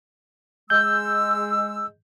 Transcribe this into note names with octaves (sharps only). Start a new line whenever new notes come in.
G#3 E6 G6